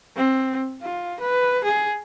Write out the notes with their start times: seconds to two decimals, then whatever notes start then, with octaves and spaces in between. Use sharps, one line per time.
0.16 C4
0.81 F4
1.20 B4
1.64 G#4